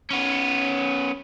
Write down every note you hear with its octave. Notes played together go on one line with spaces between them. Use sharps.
B3 C#4